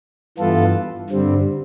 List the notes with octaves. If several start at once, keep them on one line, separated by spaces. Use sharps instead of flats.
G2 E3 B3 F4 A4
G2 D3 G3 C4